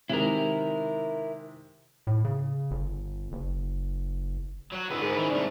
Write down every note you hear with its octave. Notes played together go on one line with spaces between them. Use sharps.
C3 D#3 G#3 E4 A#4
A2
C#3
G1
F#1
F#3 F#4
C#2 D3 B3 D#4 E6
G#2 G#3 A#4
D#3 C#4 E4
C2 A3 D4 D5